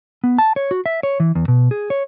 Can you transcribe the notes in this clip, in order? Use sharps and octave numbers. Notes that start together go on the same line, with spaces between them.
B3
A5
C#5
F#4
E5
C#5
E3
E2
B2
G#4
C#5